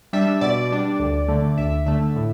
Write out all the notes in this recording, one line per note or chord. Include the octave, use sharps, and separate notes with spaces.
G3 D4 E5
B2 D5
G3 D4
D2
D3 A3
D2 E5
D3 A3 E5
A2